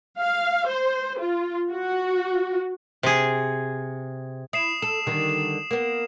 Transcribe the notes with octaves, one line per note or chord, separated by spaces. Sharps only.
F5
C5
F4
F#4
C3 G#4
E4 D#6 C7 E7
A4 E7
D3 D#3 G3
A#3 B3